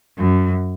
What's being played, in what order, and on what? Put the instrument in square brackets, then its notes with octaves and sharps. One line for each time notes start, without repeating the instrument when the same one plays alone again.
[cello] F#2